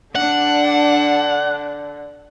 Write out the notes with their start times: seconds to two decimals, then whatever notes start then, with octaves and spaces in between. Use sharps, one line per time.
0.15 D3 D4 F#5